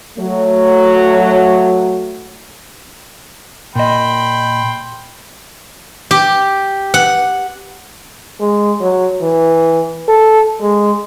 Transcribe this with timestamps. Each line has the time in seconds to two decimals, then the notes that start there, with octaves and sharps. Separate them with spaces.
0.18 F#3 A3
3.75 A#2 D#5 G5 B5 C6
6.11 G4
6.94 F#5
8.41 G#3
8.81 F#3
9.22 E3
10.08 A4
10.61 G#3